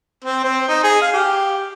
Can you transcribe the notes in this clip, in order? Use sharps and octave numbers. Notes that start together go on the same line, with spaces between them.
C4
C4
D#4
G#4
F5
G4